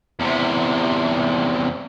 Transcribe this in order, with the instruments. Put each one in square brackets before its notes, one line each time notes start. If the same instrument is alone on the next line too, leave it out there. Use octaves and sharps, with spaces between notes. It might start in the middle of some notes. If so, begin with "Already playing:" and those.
[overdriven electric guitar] E2 C3